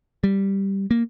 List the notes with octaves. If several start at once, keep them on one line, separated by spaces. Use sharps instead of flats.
G3
A#3